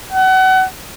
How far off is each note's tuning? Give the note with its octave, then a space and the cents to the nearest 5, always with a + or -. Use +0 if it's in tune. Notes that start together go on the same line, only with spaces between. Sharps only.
F#5 +30